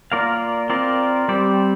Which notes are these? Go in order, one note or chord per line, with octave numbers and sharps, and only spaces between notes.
A#3 F4 A#4 D5 F5
C4 F4 A#4 D5
G3 C4 G4 D5